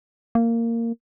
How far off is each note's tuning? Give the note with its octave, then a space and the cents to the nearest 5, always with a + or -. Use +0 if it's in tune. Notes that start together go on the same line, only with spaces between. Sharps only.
A#3 -15